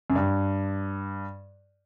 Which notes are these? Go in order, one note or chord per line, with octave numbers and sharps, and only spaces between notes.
F#2
G2